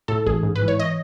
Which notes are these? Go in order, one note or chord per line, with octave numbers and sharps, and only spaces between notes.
A2 A4
A1 G#4
G#2
B4
E3
C#5
D#5